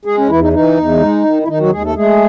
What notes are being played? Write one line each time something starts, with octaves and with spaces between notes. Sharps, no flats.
G#3 G#4
C#4
E2 E3 E4
D#4
E3 D#4
E2
G#3
D#3
E4
D#3 D#4
F#3 F#4
D#2 G#3 G#4
A3 A4
G#3 A3 G#4